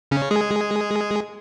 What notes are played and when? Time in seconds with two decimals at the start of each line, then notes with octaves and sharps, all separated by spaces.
0.11 C#3 C#4
0.31 G#3 G#4